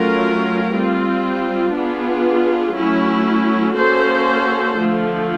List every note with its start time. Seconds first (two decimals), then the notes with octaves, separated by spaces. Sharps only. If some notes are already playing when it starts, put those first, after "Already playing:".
Already playing: F#3 A3 C#4 F4 A#4
0.73 G3 C4 F4
1.74 B3 D4 F4 G#4
2.75 F#3 A3 C#4 E4
3.76 A#3 C#4 F#4 A4 C5
4.78 D3 F3 A3